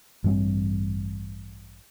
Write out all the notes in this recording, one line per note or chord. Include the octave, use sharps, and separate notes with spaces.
A1 G2 G3 C4